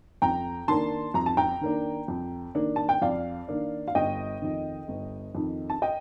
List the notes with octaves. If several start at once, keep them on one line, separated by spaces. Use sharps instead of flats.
F2 G5 A#5
D#3 A#3 D4 A5 C6
F2 A#5
A5
G5 A#5
D#3 A#3 D4
F2
D#3 A#3 D4
A5
G5
F2 D5 F5
D#3 A#3 D4
F5
G1 D#5 G5
F2 D#3
G1
F2 D#3
A5
D#5 G5